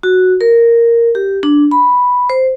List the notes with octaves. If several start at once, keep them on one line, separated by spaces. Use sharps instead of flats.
F#4
A#4
G4
D4
B5
C5